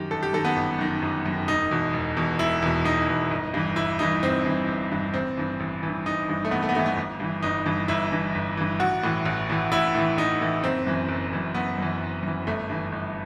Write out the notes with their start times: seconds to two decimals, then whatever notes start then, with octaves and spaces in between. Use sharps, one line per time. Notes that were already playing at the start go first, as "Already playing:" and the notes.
Already playing: F#2 D#3 G4
0.11 G1 A4
0.23 G4
0.33 F#2 D#3 A4
0.45 B3
0.56 G1
0.79 F#2 D#3
1.02 G1
1.26 F#2 D#3
1.48 E1 D#4
1.71 E2 B2
1.93 E1
2.17 E2 B2
2.39 E1 E4
2.62 E2 B2
2.85 E1 D#4
3.08 E2 B2
3.31 G1
3.54 G2 E3
3.76 G1 E4
3.99 G2 E3 D#4
4.23 G1 C4
4.45 G2 E3
4.68 G1
4.91 G2 E3
5.14 A1 C4
5.37 G2 E3
5.60 A1
5.83 G2 E3
6.06 A1 D#4
6.28 G2 E3
6.45 A3
6.51 A1 B3
6.62 A3
6.69 B3
6.75 G2 E3 A3
6.86 B3
6.97 G1
7.20 G2 E3
7.42 G1 D#4
7.66 G2 E3
7.88 G1 E4
8.12 G2 E3
8.35 G1
8.57 G2 E3
8.80 A1 F#4
9.03 A2 E3
9.25 A1
9.49 A2 E3
9.72 A1 E4
9.95 A2 E3
10.17 A1 D#4
10.41 A2 E3
10.63 F#1 C4
10.87 F#2 E3
11.09 F#1
11.32 F#2 E3
11.54 F#1 B3
11.78 F#2 E3
12.01 F#1
12.23 F#2 E3
12.47 G1 A3
12.69 G2 E3
12.92 G1